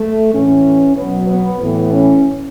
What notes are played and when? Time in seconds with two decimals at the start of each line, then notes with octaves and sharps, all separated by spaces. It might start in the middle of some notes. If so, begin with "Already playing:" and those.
Already playing: A3
0.33 A2 E3 C#4
0.96 B2 F#3 B3
1.28 B3
1.60 A2 E3 B3
1.92 C#4